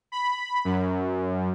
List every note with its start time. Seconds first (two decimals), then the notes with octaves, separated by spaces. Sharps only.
0.12 B5
0.65 F#2